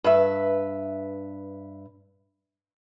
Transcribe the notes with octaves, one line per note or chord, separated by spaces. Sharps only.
G2 B4 E5